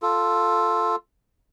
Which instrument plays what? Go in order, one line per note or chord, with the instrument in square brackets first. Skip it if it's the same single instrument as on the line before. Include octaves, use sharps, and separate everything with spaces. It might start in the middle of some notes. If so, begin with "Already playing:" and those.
[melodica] F4 A4